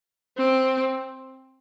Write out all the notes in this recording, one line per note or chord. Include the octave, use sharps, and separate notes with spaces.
C4